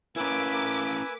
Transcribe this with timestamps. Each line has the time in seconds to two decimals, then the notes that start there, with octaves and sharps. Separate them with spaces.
0.16 A#3 C#4 E4 B4 G#5 D6 E6 B6